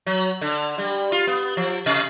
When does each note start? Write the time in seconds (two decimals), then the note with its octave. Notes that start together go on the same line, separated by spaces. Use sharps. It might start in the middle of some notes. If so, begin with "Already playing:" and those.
0.06 F#3
0.41 D3
0.78 G3
1.12 F4
1.27 B3
1.57 F3
1.86 C3